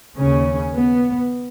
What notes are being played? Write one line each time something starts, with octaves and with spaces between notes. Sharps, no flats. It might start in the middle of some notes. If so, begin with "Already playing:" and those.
D#2 C#3 C#4
B3